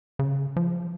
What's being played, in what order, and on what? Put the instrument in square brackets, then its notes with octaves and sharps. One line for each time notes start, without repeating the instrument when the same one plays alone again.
[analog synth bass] C#3
F3